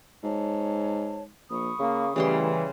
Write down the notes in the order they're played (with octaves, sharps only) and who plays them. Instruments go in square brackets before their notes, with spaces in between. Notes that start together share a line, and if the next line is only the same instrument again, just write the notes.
[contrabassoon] G#2 [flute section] C#5 A5
[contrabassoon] A#1 [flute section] B5 C#6 D#6
[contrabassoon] C#3 [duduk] A#3
[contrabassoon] A1 [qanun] C#3 G3 C6 [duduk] E3